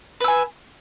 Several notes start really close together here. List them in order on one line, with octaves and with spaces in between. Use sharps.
B4 E6 G#5